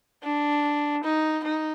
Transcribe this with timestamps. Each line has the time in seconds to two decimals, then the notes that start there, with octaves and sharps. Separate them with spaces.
0.23 D4
1.04 D#4
1.44 D#4